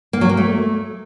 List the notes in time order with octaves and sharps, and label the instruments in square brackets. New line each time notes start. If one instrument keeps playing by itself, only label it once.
[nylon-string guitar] A#3
F#3
A#3
A3